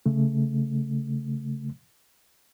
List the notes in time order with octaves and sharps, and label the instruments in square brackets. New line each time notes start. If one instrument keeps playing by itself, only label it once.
[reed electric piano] C#3 A3